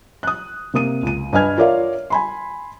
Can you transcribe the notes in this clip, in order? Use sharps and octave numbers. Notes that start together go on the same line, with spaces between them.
D#6 F#6
C3 A#3 D#6 D#7
C#2 D#7
G2 B4 D#5 G#5 F6 G#6
F4 A#4 C#5 D5 E5 F5
G#5 B5 C6